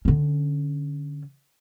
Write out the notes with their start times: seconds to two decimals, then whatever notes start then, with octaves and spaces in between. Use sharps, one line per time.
0.05 D3 C#4